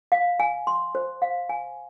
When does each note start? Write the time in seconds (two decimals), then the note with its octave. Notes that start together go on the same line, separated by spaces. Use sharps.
0.12 F5
0.40 G#5
0.67 C6
0.95 C5
1.22 F5
1.49 G#5